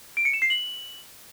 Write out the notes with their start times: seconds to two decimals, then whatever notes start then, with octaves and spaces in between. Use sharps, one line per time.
0.17 D7
0.25 C#7
0.34 E7
0.42 C7
0.50 F#7